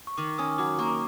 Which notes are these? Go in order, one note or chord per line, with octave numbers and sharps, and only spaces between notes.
C#6
D#3 D6
C#4 D#6
F#3 D6
A#3 C#6